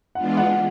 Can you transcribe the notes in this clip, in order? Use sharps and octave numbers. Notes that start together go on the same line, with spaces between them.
E3 G#3 B3 D4 F4 F#5
F#5